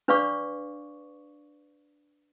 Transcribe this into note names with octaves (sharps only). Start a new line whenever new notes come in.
D4 B4 D5 F5 C#6 D6